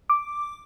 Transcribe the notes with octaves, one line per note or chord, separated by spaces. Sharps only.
D6